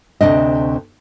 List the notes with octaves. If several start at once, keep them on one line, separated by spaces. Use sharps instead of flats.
D2 C3 D4 D#5